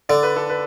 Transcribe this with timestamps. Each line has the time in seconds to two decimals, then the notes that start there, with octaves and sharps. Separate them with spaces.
0.09 D3 D5
0.23 B4
0.36 A4
0.49 B4